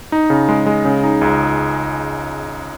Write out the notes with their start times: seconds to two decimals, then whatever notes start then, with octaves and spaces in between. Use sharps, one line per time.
0.12 D#4
0.30 C#3
0.49 G#3
0.66 G#3
0.85 C#3
1.03 D#4
1.21 C#2